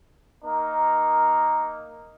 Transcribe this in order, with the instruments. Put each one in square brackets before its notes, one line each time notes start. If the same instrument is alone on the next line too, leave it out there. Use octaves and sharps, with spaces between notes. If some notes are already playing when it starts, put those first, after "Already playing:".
[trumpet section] A#3 D#4 A#4